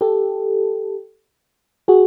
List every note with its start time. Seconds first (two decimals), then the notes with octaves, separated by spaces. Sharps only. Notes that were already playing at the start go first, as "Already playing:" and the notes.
0.01 G4 A4
1.88 F#4 G#4